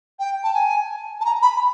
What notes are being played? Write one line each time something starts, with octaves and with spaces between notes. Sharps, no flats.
G5
A5
G#5
A5
A#5
B5